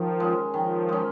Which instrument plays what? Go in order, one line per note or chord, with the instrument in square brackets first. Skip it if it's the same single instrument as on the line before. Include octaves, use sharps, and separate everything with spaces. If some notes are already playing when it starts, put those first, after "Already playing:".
Already playing: [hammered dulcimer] D#3 [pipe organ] F3
[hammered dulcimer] G#3 C#4
[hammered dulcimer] D#3 [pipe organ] F3
[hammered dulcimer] G#3 C#4